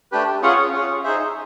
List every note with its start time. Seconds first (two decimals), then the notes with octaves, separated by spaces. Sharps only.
0.12 A3 D4 G4 B4
0.42 C#4 F4 G#4 C#5 F#5
0.73 C#4 F4 G#4 C#5 F#5
1.03 D#4 G#4 C5 E5